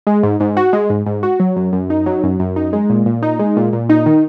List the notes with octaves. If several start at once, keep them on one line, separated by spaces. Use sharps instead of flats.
G#3
G#2
G#2
F#4
G#3
G#2
G#2
F#4
F#3
F#2
F#2
D#4
F#3
F#2
F#2
D#4
G#3
A#2
A#2
D#4
G#3
A#2
A#2
D#4
D#3